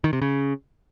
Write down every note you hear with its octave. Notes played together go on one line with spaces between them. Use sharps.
D#3
C3
C#3